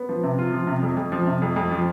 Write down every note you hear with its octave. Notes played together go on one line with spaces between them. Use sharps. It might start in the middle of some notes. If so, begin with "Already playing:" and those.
Already playing: B3
F3
C3
F4
F3
C3
F2
F2
F3
C3
F2
F2
F3